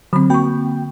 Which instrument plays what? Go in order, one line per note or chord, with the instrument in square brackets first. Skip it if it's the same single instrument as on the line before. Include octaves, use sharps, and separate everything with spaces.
[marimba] D3 C4 [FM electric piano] F#3 B5
[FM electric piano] A#3 F#4 G5 [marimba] B5 C#6